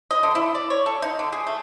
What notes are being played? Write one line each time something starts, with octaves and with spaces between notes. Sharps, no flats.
D#5
D3
E4
D5
C#5
A4
D#4
D3
G#4
A3